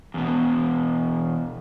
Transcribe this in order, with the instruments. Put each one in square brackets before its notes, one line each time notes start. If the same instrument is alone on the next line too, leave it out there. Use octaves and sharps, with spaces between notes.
[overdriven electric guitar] E2 B2